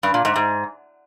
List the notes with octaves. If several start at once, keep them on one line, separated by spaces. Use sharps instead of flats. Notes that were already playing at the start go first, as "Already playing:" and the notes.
G2
A#2
G#2
G#2